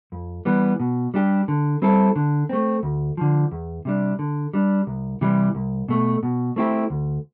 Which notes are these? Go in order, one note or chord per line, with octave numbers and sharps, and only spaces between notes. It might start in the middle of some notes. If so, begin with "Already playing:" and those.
F2
E3 G3 B3
B2
G3 D4 G4
D3
G3 C4 E4 A4
D3
A3 C4
D2
D3 F3
E2
C3 G3 D4
D3
G3 D4
C2
C3 E3 G3
C2
B2 A3
B2
A3 C4 E4 G4
D2